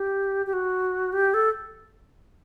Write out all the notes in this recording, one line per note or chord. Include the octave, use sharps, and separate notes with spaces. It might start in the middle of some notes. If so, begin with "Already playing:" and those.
Already playing: G4
G4
F#4
G4
A4